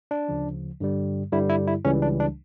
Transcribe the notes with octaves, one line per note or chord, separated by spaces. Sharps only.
D4
D2 C#3 F3
G2 D3 G3
G2 D3 G3 E4
E4
E4
C#2 C#3 E3 G3 C#4
D4
D4